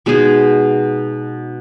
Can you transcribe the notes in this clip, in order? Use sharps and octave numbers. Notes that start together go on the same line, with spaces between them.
B2 G#3 D#4 G#4